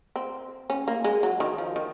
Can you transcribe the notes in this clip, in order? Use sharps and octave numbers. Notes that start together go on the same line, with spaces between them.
C4
C#4
A#3
G#3
F#3
D#3
F3
D#3